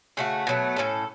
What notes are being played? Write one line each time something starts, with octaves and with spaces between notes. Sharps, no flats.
C#3 A3 F#4
B2 F#3 A3
A2 E3 C#4 A4